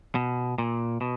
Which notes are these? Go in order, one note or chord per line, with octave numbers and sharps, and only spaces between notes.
B2
A#2
B2